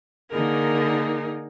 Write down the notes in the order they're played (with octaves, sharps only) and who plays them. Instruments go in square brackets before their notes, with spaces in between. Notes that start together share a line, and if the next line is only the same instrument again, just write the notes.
[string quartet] D3 A#3 D#4 G#4 A#4